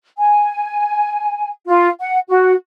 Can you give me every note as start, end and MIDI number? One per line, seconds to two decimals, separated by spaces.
0.18 1.49 80
1.67 1.89 65
2.00 2.19 78
2.29 2.53 66